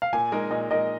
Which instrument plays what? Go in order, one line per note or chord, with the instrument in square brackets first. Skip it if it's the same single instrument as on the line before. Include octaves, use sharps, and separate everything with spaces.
[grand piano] F5
[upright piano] A#2 [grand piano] G#5
[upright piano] G#3 D#4 A#4
[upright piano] A#2 [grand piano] D#5
[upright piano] G#3 D#4 A#4 [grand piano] D#5